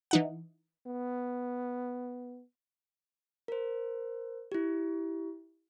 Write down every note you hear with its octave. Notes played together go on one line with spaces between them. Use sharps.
E3 D#4 F#5
B3
A#4 C5
E4 G4